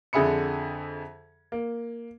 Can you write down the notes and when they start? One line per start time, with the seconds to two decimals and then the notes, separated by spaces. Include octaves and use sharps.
0.13 F2 D3 G#4 E5 B5 C#7
1.52 A#3